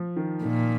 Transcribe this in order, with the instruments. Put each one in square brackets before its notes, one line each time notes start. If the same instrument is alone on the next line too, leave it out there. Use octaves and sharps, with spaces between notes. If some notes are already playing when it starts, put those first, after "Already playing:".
Already playing: [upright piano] F3
D#3
[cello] A#2 [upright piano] D#3